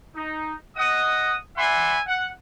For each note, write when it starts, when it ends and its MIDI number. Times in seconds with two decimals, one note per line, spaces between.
0.16 0.54 63
0.76 1.35 75
0.76 1.35 78
0.76 1.35 87
1.58 1.98 74
1.58 1.98 76
1.58 1.98 78
1.58 1.98 80
1.58 1.98 83
1.58 1.98 84
2.07 2.28 78